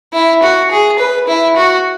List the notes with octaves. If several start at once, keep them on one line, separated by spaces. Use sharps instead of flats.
E4
F#4
G#4
B4
E4
F#4